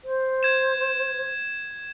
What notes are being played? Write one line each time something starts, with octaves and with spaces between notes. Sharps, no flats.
C5
G#6 E7